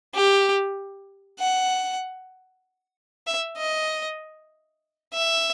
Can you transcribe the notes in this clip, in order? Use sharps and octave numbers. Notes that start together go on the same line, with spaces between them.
G4
F#5
E5
D#5
E5